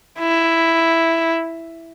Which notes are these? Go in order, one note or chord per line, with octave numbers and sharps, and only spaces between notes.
E4